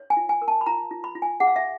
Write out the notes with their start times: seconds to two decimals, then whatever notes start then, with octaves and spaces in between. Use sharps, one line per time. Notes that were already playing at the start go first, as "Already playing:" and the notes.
Already playing: C#5
0.10 G#5
0.17 F4
0.29 G#5
0.42 A#4
0.48 A5
0.61 B5
0.66 F4 A#5
0.91 F4
1.04 B5
1.15 F4
1.22 G#5
1.40 G#4 F#5
1.47 F5
1.56 E5